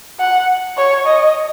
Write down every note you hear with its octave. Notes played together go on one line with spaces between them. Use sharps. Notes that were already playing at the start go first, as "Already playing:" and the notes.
F#5
C#5
D#5